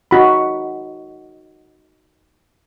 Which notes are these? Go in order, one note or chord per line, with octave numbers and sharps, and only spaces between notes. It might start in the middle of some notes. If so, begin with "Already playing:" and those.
D#4 F#4 B5